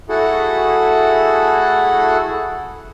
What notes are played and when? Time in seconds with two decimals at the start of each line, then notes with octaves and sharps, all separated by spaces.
0.09 A3 E4 F#4 G#4 A4 F#5